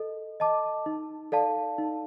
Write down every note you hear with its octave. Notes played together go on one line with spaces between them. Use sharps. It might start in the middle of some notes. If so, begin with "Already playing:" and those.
Already playing: A4 D#5
D#5 A5 D6
D#4
A4 D5 F5 A5
D#4